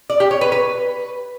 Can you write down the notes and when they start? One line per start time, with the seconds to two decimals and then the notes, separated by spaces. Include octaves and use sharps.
0.10 D5
0.20 G4
0.31 C#5
0.41 B4
0.52 B4